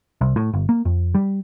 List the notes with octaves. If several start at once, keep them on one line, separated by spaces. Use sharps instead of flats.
C2
A2
G1
A#3
F2
G3